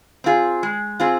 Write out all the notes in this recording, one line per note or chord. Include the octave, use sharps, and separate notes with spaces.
C4 F4 G#4
G#3
C4 F4 G#4